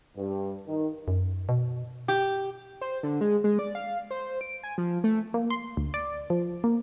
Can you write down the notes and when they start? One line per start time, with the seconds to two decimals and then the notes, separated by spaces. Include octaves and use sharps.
0.16 G2
0.66 D#3
1.08 F#2
1.49 B2
2.08 G4
2.81 C5
3.03 D3
3.21 G#3
3.44 G#3
3.59 D5
3.75 F5
4.11 C5
4.41 D7
4.63 G#5
4.78 F3
5.04 A3
5.34 A#3
5.50 C6
5.77 D2
5.94 D5
6.30 F3
6.64 A#3